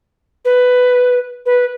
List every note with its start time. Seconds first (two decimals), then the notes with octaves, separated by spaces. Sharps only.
0.45 B4
1.46 B4